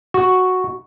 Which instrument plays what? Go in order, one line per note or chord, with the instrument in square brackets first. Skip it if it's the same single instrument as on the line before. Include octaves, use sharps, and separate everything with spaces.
[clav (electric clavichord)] F#4